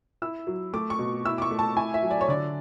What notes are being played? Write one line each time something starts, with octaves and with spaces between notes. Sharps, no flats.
E4 E6
F#3
A3 D6
C#6
B2
E4 E6
D6
C#6
A3
A5
E4 G#5
E5
F#3
D5
C#5
D3 D5